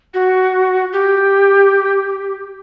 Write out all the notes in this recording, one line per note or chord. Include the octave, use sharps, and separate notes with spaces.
F#4
G4